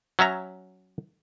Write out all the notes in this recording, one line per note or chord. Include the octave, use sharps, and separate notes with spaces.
F#3 C#4 E5 A#5